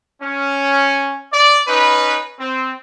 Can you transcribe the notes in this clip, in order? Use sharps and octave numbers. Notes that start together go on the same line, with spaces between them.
C#4
D5
C#4 D#4 B4
C4